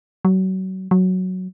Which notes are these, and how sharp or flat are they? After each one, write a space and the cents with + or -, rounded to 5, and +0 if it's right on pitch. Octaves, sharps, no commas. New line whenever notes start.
F#3 +30
F#3 +0